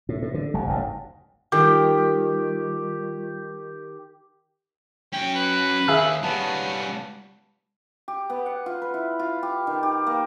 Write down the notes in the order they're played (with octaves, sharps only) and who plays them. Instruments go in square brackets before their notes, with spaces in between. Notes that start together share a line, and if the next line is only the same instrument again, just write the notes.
[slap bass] A2
A2
D3
F1 G3
F#1 D2 G#2
[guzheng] D#3 [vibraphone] G3 F4 [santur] G4
[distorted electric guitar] C#4 F#4 [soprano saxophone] G5
[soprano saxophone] B4
[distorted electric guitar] D#2 [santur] G#4 F5 [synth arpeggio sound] E5 G#5 E6
[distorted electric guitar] G3 C#4 [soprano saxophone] B3 [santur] A5
[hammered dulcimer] G4
B3
F#5
F4
B4
E4
F4
G4
D#3
G4
A#3